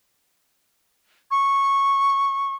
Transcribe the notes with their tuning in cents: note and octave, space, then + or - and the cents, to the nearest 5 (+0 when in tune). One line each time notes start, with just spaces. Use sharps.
C#6 -10